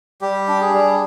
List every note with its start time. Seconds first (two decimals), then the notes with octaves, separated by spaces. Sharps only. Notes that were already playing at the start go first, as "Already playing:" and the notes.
0.21 G3 G4
0.48 D4
0.61 G#4
0.74 G3